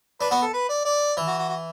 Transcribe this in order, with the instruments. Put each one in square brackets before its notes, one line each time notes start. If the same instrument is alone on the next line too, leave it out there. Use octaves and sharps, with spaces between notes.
[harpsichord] D4 [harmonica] B4
[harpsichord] B3 [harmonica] F#4
[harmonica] A4
B4
D5
D5
[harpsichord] E3
[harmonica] F#4
F#4
F#4